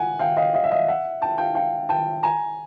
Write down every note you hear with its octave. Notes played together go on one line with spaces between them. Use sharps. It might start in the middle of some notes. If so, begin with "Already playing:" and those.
Already playing: F#5 G#5
F5 G5
D#5 F5
D#5 F5
E5
D#5 F5
E5 F#5
G5 A5
F5 G5
F5 G5
G5 A5
G#5 A#5